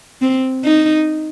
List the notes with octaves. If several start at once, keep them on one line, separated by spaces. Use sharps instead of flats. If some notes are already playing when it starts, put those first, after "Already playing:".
C4
D#4